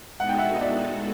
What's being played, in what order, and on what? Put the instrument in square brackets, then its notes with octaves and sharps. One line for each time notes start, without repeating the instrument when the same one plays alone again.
[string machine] G#3 B3 D#4 F#4 A4 [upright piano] F#5
[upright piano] G5
E5 F#5
D#5
D5 E5